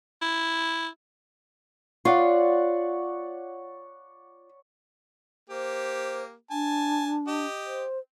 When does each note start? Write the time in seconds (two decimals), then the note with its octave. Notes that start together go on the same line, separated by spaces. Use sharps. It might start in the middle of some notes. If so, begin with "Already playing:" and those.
0.22 E4
2.05 F4 C#5 D5 F#5
5.50 A#3 G4 C5
6.51 D4 G#5 A5
7.27 G4 D#5
7.66 C5